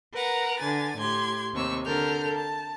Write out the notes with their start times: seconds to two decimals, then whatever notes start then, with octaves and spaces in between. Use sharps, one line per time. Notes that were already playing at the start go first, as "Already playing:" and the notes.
0.13 A#4 B4 F#5 A#5
0.59 D3 G#5 A6
0.98 A2 G4 C6 G#6
1.53 D#2 C3 C#6 E6
1.85 D3 A4 A#4 F6 G6
2.34 A5